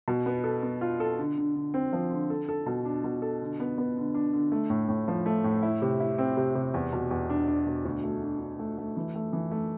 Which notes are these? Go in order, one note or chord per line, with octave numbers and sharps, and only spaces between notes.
B2
B3
A4
B3
F4
A4
D3
D3
D3
C4
F3
D3
A4
A4
B2
D4
B2
A4
D3
B3
B3
D3
D4
D3
A3
A2
A2
F3
A3
A2
E4
C3
E4
C4
C3
C3
E2
B2
E2
D4
D4
B2
D2
A3
D4
D4
A3
A3
E3
A3
E3
A3